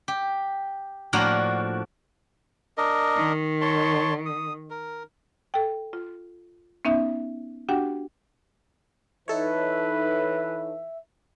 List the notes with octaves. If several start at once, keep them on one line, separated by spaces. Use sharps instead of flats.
G4
A2 F3 A#3 D4 F#4 A#5
D4 A#4 D#5
D#3
C#5 A5 C6
D#6
A#4
A4 G5
F4
B3 C#4 D#4 E5
D4 F#4 G4 F#5 G5
E3 D#4 A4 B4 C#5 E5